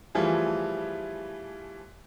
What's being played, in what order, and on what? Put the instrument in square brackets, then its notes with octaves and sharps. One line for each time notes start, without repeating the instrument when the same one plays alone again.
[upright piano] E3 F3 G3 A3 F4 G#4